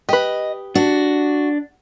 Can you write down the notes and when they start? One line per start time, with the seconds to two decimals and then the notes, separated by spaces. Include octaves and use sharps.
0.09 G4 B4 D#5
0.75 D4 F#4